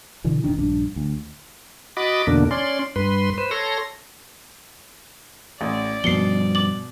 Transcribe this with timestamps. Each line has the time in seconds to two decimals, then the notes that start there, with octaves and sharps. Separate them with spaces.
0.24 B2 D3 E3
0.44 E1 A1 D#3 D4
0.58 A#1 G2 D4
0.96 D2
1.97 F#4 D#5 B5 D6 A6
2.27 E2 B2 D3 A#3 D4
2.51 C#4 D5 C6
2.96 G2 B4 C6
3.38 B4 C5
3.51 A4 C#5 C6 A#6
5.61 A1 D5
6.04 G2 B2 F3 C7 C#7 G7
6.55 D6 A6 F#7